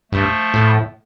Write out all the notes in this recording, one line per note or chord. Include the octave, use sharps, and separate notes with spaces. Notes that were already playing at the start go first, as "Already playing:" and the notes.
G2 F3 A3
A2